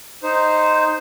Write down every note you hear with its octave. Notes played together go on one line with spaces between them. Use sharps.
D#4 C5